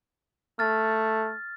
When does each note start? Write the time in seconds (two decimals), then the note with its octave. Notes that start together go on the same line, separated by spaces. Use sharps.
0.59 A3 F6 A6